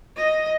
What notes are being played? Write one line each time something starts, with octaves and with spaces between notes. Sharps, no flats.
D#5